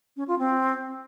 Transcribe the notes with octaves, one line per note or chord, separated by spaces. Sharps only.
C#4
F4
C4